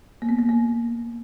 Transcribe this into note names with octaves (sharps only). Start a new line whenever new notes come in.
A#3
B3
A#3
A#3